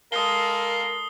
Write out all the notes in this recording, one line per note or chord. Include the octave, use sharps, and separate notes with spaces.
G#3 A4 A#4 F5 D#6 C7 G7